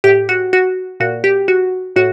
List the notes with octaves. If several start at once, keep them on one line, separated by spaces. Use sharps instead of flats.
A2 G4
F#4
F#4
A#2 F#4
G4
F#4
A2 F#4